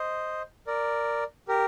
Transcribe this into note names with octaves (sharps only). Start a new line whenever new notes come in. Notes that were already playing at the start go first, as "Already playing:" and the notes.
Already playing: C5 D#5
A#4 D5
G4 A#4